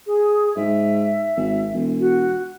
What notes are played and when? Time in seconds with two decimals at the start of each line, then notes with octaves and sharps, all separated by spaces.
0.07 G#4
0.57 G#2 E5
1.36 G#1
1.73 E1
2.00 F#4